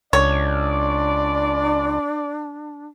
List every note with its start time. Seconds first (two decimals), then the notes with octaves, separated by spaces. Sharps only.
0.13 C#2 D4 C#5 D5